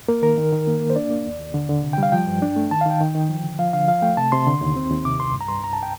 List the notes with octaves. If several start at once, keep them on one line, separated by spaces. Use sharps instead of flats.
A#3 A#4
D#3 A#4
D#3
D#3
A#3
A#3
C5
D4 D5
A#3
D#2
D#2
D3
D3
C3
G5
G3 F5
F3 G5
G2
D4
A3
D#3 A5
F5
D#3 G5
D#3
D#3
F3
D3
F3 F5
D3 F5
F3 F5
A3 G5
C3 A5
C3 C6
D3
D#2
C4
D#2
C3 D6
C2 C6
G2
A#5
G2 C6
C2 A#5
A5
G5